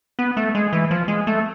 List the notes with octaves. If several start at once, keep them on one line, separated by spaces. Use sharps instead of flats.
B3
A3
G#3
E3
F3
G#3
A3